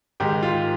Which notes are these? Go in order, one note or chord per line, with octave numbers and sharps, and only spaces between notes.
G#2 D#3 G#3 G4
F4